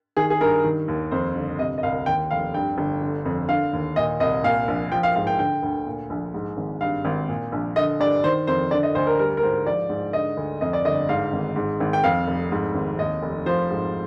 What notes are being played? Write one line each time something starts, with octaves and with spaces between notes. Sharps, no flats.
D#3 G#4
G#4
G2 A#4
D#3
D#2
F2 C5
G1
C3 D#5
D#5
C2 F5
D#2 G5
F1 F5
G2 G5
G1
D3
F2
D3 F5
D#2
A#2 D#5
C2 D#5
A#2 F5
A#1
F3 G5
F5
G#2 F5
G5
D3 G5
D2
A#2
A#1
G#2
G#1
G2 F5
G#1
A#2
A#1
D3 D#5
G2 D5
D#3 C5
F2 C5
D3 D5
D#5
D2 C5
A#4
G3 A#4
A#4
G#2 C5
F3 D5
G#2
D3 D#5
D2
F2 D#5
D5
G1 D#5
G#2 F5
G#1
G#2
G#1
G5
F2 F5
F1
G#2
G#1
D#2 D#5
F1
F3 C5
G#2